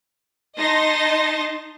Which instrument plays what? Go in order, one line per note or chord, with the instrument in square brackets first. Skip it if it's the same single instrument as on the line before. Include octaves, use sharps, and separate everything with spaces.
[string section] D#4 D#5 A5 C6 A#6